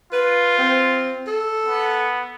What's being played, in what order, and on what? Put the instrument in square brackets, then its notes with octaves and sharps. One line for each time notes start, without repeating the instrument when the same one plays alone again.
[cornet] F4 [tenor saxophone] B4
[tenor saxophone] C4
A4
[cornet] B3